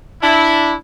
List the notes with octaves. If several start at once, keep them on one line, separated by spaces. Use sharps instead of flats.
D4 E4